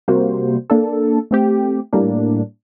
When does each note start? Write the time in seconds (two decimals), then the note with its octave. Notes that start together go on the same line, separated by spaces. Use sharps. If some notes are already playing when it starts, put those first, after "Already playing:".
0.08 C3 G3 A#3 F#4 C5
0.70 A#3 D4 A4
1.31 A3 C4 G4
1.93 A2 G3 A#3 D4